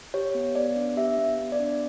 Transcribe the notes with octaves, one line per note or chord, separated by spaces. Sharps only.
G4 C#5
B3
B3 D5
D4
G4 E5
B3
B3
D5
D4